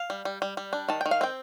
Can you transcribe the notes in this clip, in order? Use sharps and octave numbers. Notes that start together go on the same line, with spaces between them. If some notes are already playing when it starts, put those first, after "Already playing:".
Already playing: F5
G3
G3
G3
G3
D4
D#3 A5
D#3 G5
F5
C4 G5